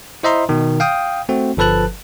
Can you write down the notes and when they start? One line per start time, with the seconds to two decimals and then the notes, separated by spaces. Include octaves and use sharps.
0.23 E4 C5 D#5 E5 A#5 C6
0.49 B2 D#3
0.80 F5 G5 D#6
1.29 A3 C4 F#4
1.57 G1 F3 A4 B4 A5 F#6